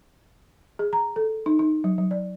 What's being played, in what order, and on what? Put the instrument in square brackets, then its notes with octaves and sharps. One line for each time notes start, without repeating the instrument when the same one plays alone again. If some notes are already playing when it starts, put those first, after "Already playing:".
[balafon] G#4
A#5
A4
D#4
D#4
F#3
F#3
D5